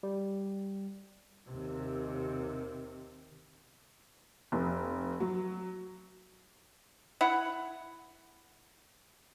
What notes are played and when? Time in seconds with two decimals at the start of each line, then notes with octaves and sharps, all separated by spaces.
0.03 G3
1.48 D#2 C3
4.52 F1
5.20 F#3
7.21 E4 F#5